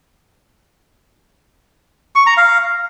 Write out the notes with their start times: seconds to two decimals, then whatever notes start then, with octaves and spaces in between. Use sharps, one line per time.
2.16 C#6
2.26 A#5
2.37 F5